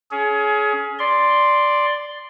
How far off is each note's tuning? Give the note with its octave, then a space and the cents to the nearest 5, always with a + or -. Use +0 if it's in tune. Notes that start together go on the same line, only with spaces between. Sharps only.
C#4 +20 G#4 +30
D5 +0 C6 +0